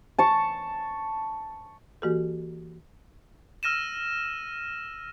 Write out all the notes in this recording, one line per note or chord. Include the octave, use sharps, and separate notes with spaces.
A5 C#6
E3 A#3 F#4 G4 A4
E6 F6 A#6 D#7 E7